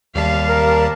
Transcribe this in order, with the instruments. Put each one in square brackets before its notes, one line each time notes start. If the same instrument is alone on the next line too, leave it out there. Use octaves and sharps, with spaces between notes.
[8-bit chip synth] D#2 G3 A5 [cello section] F5
[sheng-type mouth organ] A#4